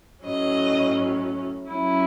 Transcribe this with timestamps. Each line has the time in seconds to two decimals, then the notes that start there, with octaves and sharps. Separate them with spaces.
0.24 A2 F#3 C#4 D#5
1.68 F#3 C#4 E4